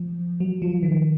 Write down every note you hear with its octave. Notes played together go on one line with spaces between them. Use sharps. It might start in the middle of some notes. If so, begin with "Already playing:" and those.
Already playing: F3
F#3
F3
D#3